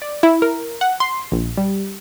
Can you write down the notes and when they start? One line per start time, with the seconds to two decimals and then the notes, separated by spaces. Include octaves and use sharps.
0.02 D5
0.23 E4
0.42 A#4
0.81 F#5
1.00 C6
1.32 A#1
1.57 G3